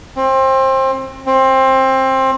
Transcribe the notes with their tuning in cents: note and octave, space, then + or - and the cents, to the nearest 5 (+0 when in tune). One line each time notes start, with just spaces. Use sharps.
C4 +25
C4 +20